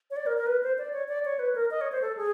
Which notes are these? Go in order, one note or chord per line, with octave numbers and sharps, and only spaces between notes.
C#5
D5
A#4
A#4
B4
C5
D5
C#5
D5
C#5
B4
A#4
D#5
C#5
C5
A4
G#4